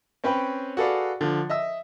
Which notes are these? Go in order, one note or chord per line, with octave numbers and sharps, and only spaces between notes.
C4 C#4 B4 C#5 G5 B5
F#4 G#4 A4 B4 D5 F5
D3 F3
D#5 E5 E6